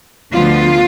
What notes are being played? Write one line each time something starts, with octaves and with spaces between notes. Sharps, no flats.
D2 D3 F3 B3 F4